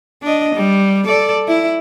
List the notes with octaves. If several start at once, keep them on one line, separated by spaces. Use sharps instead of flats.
D4 D#5
G3
A4 D5
E4